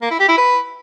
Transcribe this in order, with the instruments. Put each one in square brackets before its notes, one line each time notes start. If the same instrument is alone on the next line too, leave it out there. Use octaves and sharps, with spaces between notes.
[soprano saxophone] A#3
E4
G4
E4
B4